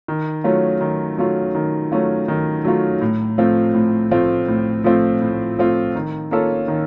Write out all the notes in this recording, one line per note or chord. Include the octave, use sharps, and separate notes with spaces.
D#3
F#3 A3 C#4 F4
D#3
F#3 A3 C#4 F4
D#3
F#3 A3 C#4 F4
D#3
F#3 A3 C#4 F4
A2
F3 A3 C4 F4
A2
F3 A3 C4 F4
A2
F3 A3 C4 F4
A2
F3 A3 C4 F4
D#3
A#3 C#4 F4 A4
D#3